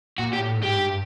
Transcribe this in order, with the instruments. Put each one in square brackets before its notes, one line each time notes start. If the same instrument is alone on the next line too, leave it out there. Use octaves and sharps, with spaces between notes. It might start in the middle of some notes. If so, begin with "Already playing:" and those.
[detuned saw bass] A#2 [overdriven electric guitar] F#4
[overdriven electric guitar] G4
[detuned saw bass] A2
G#2
[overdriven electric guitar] G4
[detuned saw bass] G2